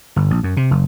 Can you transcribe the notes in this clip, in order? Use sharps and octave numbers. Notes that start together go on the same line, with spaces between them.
G1
A#1
F#2
C3
F#1